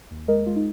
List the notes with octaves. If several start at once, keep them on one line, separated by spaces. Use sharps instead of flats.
D#2
G#3 A#4 D#5
G#3 F4
D#4